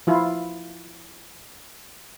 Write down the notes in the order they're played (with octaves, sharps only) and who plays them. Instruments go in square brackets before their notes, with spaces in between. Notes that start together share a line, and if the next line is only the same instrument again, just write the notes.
[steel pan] F3 E4 F4